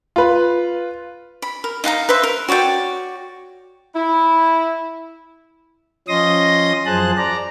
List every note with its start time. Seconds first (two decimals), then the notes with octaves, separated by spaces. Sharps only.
0.16 F4 B4
1.42 B5
1.64 A#4
1.84 D#4 F5 F#5 A#5
2.09 B4 C5 E5
2.23 A#4
2.48 F#4 C#5 D5 G5
3.95 E4
6.08 F3 C#4 D#5 C6 D#6 A#6
6.86 F#2 F3 G#4 C5 A5 F#6
7.17 D5 A#5